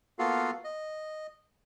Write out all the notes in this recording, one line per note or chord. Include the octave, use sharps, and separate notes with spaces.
A#3 B3 F4 F#4 A4 F5
D#5